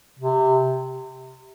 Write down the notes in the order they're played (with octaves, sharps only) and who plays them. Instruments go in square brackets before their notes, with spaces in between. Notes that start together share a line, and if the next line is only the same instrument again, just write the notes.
[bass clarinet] C3